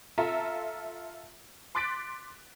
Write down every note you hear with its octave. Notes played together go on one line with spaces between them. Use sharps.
F4 A4 E5 A#5
C6 D6 F#6 A6 B6 D7